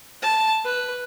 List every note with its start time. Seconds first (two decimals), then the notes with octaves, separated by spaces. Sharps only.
0.22 A5
0.65 B4